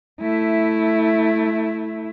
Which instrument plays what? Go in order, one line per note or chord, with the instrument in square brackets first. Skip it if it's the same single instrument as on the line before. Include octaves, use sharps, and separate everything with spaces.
[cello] A3 E4